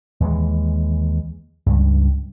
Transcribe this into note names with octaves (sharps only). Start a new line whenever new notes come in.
D#2 E3 G#3
C#2 G2